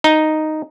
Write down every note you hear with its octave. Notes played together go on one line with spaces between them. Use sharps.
D#4